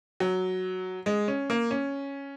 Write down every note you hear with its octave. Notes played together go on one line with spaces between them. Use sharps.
F#3
G#3
C#4
A#3
C#4